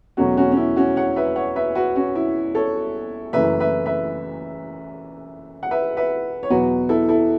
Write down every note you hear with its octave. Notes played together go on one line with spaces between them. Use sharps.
E2 B2 F#3 A3 C#4 F#4
C#4 F#4
C#4
E4
C#4 F#4
C#5 F#5
B4 E5
C#5 F#5
B4 E5
F#4 B4
C#4 F#4
E4
A4 C#5
F#1 F#2 E3 A3 B4 E5
B4 E5
B4 E5
F#5
B4 E5
B4 E5
C#5
E2 B2 F#3 F#4 B4
E4 A4
E4 A4